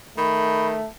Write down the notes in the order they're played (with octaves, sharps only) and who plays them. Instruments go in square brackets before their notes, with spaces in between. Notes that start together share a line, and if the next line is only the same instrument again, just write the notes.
[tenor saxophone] D#3 [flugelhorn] A3 [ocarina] B5